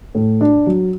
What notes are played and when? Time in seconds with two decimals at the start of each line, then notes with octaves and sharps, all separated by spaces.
0.15 A2
0.41 D4
0.67 F#3